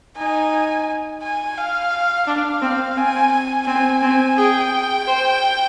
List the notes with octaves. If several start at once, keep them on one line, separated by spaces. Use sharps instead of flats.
D#4 G#5
G#5
F5
D4 F5
C4
C4 G#5
G#5
C4 G#5
C4
G#4 G5
C5